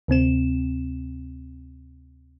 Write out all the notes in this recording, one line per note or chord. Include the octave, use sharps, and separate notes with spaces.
D2 C3 C4 E7